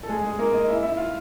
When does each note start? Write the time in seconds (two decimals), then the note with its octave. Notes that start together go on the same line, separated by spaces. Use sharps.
0.03 A4
0.09 G#3 G#4
0.24 G#3 G#4
0.39 A#3 A#4
0.53 D#4 D#5
0.68 E4 E5
0.83 E4 E5
0.97 F4 F5